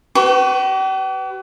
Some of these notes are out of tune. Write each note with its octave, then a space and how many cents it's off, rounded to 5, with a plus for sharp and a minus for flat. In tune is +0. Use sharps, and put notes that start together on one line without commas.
G4 -45 B4 +25 C#6 +0